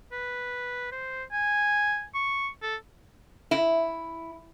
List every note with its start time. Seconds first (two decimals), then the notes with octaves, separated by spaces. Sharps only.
0.12 B4
0.92 C5
1.32 G#5
2.14 C#6
2.62 A4
3.51 E4